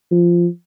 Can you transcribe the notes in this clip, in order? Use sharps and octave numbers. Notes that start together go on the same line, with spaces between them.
F3